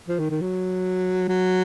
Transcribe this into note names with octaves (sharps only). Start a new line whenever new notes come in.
F3
D#3
D#3
F#3
F#3